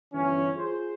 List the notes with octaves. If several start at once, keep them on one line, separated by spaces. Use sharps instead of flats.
G1 E3 C#4
F4 G#4 C5